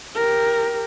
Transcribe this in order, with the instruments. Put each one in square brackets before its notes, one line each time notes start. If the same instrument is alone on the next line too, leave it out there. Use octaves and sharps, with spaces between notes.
[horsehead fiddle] G4 A#4